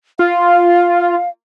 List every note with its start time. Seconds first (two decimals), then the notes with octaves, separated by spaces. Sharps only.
0.19 F4 F5